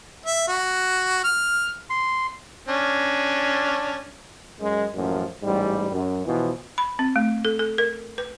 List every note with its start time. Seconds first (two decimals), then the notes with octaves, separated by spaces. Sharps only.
0.26 E5
0.48 F#4
1.24 F6
1.90 C6
2.69 C#4 D4
4.60 F#2 G#3
4.95 A1 F#2 F3 A#3
5.42 A1 G#2 G3
5.92 F#2
6.25 B2 E3 F3
6.78 B5
6.99 C4
7.16 A3
7.45 A4
7.59 A4
7.78 A#4
8.18 B4